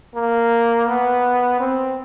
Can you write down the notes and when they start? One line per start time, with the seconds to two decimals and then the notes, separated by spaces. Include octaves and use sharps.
0.15 A#3
0.87 B3
1.60 C4